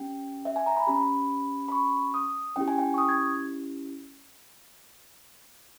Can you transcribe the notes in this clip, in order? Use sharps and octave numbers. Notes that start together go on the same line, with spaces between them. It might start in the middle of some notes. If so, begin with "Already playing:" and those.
Already playing: C#4 G4 G5
E5
G#5
A#5
B5
C#4 G4 B5
B5
C#6
D#6
C#4 E4 G4 G5
G#5
G5
C#6
D#6
G#6